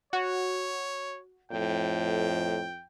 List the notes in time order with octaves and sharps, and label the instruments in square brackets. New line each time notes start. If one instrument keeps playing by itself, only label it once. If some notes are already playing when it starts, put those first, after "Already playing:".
[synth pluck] F#4 [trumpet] C#5
[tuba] F2 [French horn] A2 [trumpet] G5